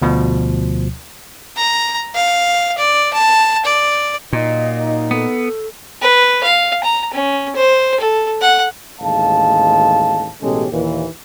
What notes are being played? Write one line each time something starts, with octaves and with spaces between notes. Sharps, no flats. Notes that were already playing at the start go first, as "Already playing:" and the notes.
D2 B2 F3
A#5
F5
D5
A5
D5
A#2 F#3 A#3 D#4 D#5
B3 A4
B4
F5
A#5
C#4
C5
A4
F#5
A1 D#2 G#3 F5 A5
A1 B2 G#3 C#4 G4 A4
D#2 A#2 E3